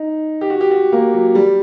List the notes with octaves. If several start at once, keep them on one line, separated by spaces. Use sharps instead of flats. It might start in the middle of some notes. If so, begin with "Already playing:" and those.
Already playing: D#4
G4
F#4
G4
F#4
A#3
F#3
G3